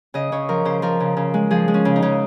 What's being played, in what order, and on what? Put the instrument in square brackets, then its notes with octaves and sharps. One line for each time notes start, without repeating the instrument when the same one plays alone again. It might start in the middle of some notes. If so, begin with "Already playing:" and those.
[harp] C#3 D#5
C#3 C#5
F3 A#4
C#3 C5
F3 A#4
C#3
C#3
G#3
F3 G#4
G#3
C#4
C#3
D#4
C#3